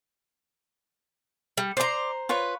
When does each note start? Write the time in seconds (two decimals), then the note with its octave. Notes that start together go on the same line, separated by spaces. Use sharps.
1.57 G3
1.77 C5 D5 A#5 C6
2.29 F4 B4 C#5